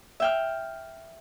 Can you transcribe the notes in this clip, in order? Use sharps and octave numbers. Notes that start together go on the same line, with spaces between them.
E5 G5 F6